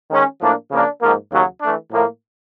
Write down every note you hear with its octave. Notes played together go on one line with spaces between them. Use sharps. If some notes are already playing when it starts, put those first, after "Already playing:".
D#3 G#3 C#4
A2 F3 A#3 D4
C#3 F3 A#3 D4
G#2 F3 A#3
D#2 C#3 F#3
E3 A3 D4
A2 F3 A#3